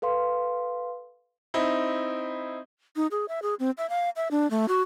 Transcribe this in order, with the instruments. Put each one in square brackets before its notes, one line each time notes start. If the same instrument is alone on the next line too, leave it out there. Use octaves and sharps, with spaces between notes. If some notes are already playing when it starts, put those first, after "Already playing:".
[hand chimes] A4 B4 F5 C6
[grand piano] C4 D#4 E4
[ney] D#4
G#4
E5
G#4
C4
E5
F5
E5
D4
A3
F#4